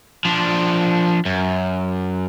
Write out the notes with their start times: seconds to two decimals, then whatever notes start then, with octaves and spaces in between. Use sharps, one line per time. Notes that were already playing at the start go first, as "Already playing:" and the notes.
0.25 F3 D4
1.25 F#2